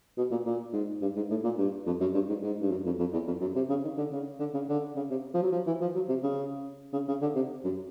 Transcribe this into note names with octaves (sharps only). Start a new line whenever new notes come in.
B2
A#2
A#2
G#2
G2
G#2
A2
A#2
G2
F2
F#2
G2
G#2
G#2
G2
F#2
F2
F2
E2
F2
F#2
C3
C#3
D#3
D3
C#3
D3
C#3
D3
C#3
C3
F3
F#3
F3
E3
F3
F#3
C3
C#3
C#3
C#3
D3
C3
F#2